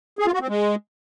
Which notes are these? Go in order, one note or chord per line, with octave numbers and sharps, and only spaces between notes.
G#4
F4
F#4
C4
G#3